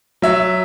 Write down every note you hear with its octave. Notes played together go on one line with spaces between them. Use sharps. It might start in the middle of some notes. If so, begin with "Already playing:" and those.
F#3 E5